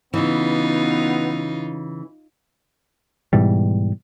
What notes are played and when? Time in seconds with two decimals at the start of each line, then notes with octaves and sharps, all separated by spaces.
0.14 C#3 E3 B3 D#4 F4
3.33 G#2 B2 E3 G3